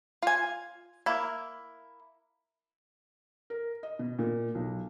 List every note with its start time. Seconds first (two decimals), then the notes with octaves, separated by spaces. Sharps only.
0.23 F4 G#5
1.06 A#3 E4
3.50 A#4
3.83 D#5
3.99 B2
4.19 A#2
4.55 B1